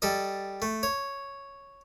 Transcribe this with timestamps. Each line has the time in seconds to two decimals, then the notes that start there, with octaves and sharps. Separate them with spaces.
0.02 G3 A4 D#5
0.62 A3
0.83 C#5